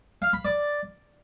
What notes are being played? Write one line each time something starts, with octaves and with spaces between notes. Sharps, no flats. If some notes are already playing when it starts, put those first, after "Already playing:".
F5
B5
D5